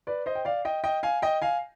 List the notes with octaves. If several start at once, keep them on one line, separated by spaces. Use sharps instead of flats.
B4 D5
C5 D#5
G5
D5 F5
D#5 G5
D#5 G5
F5 G#5
D#5 G5
F5 G#5